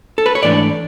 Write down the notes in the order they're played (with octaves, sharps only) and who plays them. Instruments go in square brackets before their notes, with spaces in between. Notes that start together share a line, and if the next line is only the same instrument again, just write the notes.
[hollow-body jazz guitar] A4
B4
C#5
G#2 E3 A3 D4 D5